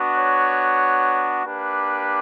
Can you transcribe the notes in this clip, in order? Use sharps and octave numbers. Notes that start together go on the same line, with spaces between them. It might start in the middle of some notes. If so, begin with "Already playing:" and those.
Already playing: B3 D4 F#4
C#5
A#3 D4 G4 B4